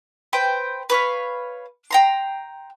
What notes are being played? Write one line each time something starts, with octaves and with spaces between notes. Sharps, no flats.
B4 C5 G5
B4 C#5 F5
G5 A#5 C6